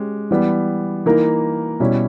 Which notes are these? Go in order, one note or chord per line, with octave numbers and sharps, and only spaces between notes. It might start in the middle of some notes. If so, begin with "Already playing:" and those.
Already playing: G#3 C#4 G4
E3 G3 B3
E3 A#3 D#4 A#4
B2 G3 C#4 E4